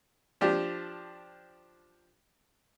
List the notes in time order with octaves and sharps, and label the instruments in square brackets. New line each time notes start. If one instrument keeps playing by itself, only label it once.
[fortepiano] F3 D4 G4